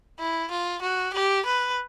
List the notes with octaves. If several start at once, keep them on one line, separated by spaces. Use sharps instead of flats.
E4
F4
F#4
G4
B4